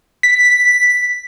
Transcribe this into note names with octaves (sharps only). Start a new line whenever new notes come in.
B6